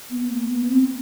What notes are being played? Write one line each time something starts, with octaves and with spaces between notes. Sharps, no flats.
B3
A#3
B3
C4